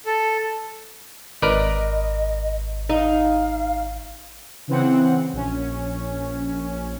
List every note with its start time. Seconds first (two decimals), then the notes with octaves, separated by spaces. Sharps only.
0.06 A4
1.42 G#1 A#4 B4 D5 D#5
2.90 D#4 F5
4.68 C#3 E3 C4 F#5
5.33 A#1 C#4